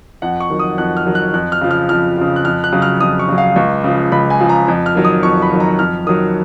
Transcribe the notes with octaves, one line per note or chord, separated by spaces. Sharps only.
F2 F#5
C#6
D#3 F#3
D#6
F2 F#6
F6
D#3 F#3
F#6
F2 F#6
F6
C#3 F3
F6
F2 F6
C#3 F3
F#6
F2 F6
F#6
C#3 F#3
F6
F2 D#6
C#6
C#3 F#3
F5
C#2 C#6
C#3 F3
C#2 B5
G#5
C#3 F3
A#5
F2
F6
D#3 F#3
D#6
F2 C#6
B5
D#3 F#3
A#5
F2 F6
D#3 F#3 D#6